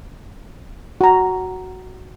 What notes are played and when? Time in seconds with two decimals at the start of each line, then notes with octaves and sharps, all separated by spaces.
1.01 F#4 A#5